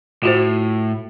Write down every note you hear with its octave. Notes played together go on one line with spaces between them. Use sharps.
A2 F4 F#4 C5